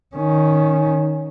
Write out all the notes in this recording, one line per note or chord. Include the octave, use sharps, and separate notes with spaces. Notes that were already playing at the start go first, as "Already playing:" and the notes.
D#3 C#4